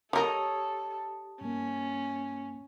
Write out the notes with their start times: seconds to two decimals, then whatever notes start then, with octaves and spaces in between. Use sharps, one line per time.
0.13 G3 G4 A4 A#4 C#5 D#5 A#5 D#6
1.41 G2 A#3 C#4